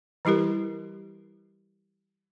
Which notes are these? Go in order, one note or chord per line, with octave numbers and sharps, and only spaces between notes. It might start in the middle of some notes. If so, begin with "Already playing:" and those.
E3 G3 E4 G4 A#4